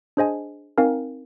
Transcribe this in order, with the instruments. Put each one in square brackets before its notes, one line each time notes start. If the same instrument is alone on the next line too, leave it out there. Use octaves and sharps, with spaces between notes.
[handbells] D4 G#4 C5 D#5 G#5
C4 D#4 A#4 F5 G#5